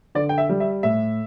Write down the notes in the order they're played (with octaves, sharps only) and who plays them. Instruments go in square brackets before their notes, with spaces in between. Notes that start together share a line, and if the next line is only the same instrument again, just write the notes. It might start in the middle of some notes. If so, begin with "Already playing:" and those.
[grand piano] D3 D5
G5
E5
G3
E5
A2 E5